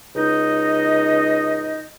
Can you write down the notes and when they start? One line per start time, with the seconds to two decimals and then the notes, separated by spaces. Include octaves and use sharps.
0.15 C#2 D#4 D#5